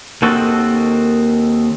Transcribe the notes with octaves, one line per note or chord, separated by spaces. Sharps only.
D#2 D#3 C4 F#4 A4